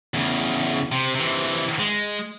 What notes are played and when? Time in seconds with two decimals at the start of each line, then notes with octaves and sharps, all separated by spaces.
0.14 E2 C#3
0.92 C3
1.15 C3 E3
1.79 G#3